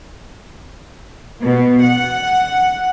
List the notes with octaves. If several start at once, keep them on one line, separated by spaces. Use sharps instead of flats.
B2
F#5